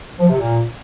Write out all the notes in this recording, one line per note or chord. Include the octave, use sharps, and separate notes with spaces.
F3
C3
A#2